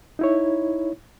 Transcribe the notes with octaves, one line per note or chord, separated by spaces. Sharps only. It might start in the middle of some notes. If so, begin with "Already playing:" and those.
D#4 E4 C#5